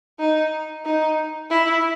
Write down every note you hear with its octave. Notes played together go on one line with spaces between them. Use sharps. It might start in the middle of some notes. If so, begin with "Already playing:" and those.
D#4
D#4
E4